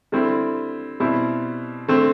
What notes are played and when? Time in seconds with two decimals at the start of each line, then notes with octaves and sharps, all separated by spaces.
0.12 D3 G3 C4 E4
1.00 B2 G3 C4 E4
1.88 D3 A3 C4